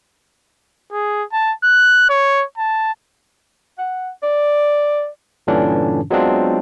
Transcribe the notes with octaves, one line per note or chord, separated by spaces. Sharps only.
G#4
A5
F#6
C#5
A5
F#5
D5
G2 A#2 D3 E3 C#4 D4
F#3 G#3 B3 C4 D4 F4